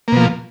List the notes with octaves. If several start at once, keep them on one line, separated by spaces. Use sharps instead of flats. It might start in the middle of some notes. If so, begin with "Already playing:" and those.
B2 F3 A#3